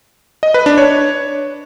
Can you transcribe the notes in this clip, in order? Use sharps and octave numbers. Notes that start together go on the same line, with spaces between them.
D#5
B4
D4
C#5